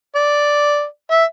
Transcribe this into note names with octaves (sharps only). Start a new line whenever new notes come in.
D5
E5